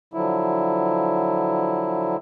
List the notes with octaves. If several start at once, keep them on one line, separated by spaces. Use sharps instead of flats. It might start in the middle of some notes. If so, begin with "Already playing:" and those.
D3 F3 F#3 E4